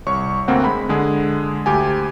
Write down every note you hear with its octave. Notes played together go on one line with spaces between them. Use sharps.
C2 C#5 C#6
D2 A#3 C4 F#5
G#3 B5
D3 G#3 G#4
D2 G4 G#5